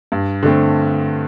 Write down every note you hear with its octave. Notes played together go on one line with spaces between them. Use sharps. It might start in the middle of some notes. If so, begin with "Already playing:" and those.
G2
D3 A3 C4